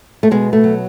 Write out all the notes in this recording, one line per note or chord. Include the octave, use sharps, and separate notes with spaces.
A3
B2 G#3
A3
F#3